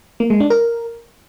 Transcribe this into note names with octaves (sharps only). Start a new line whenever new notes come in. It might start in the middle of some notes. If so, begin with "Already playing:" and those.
A#3
G#3
D4
A#4